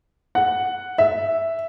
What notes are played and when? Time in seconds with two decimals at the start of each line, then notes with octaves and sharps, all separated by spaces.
0.35 F#5
0.98 E5